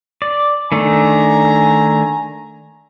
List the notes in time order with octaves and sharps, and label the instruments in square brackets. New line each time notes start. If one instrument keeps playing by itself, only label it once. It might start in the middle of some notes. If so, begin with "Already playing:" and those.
[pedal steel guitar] D5
[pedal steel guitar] D#3 A3 D4 [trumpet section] G#5 A#5